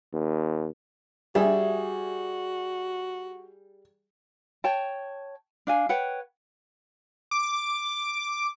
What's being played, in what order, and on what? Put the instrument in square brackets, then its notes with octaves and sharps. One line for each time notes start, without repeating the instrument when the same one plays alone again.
[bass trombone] D#2
[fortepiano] G3 G#4 [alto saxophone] F#4 [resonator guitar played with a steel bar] E5
[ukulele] C#5 G5 A5
D4 F5 G#5
B4 C#5 F#5 G5
[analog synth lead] D6